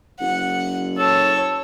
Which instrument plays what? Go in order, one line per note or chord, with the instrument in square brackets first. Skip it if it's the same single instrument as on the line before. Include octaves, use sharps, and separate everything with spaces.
[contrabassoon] F#1 [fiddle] F#5
[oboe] A4 [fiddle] C#5